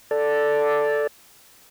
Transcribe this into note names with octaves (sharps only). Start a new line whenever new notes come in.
A4 D5